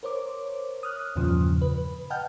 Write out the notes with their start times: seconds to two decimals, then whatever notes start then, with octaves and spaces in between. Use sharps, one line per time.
0.03 A#4 C5 C#5 D6
0.83 D#6 F6 F#6
1.16 E2 G2 A#2 C#3 F3
1.62 B4
2.10 D#5 F#5 G5 A5 F6 G6